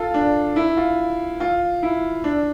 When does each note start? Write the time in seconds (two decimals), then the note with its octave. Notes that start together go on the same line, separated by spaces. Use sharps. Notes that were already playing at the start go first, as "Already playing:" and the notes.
Already playing: F4 A4
0.14 D4
0.56 E4
0.77 F4
1.40 F4
1.83 E4
2.24 D4